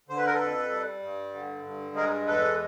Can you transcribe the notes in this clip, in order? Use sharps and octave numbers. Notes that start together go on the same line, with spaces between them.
D3 C5
B4
A#4
A4 B4
F2
G3
G2
D3
G2
G#3 G#4 A#4
E2 A4 B4